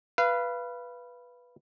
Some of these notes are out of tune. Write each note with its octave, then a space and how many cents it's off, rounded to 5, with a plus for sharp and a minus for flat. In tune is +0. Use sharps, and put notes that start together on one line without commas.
B4 -5 F5 -30